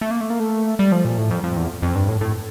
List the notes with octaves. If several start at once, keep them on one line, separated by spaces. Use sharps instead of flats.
A3
A#3
A3
A#3
A3
G3
F3
A#2
A2
F2
F2
E2
F2
G2
A2
A2